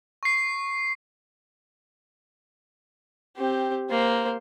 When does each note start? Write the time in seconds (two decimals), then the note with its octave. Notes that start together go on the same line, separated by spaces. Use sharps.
0.23 C#6 C7
3.37 C4 G4
3.90 A#3 C5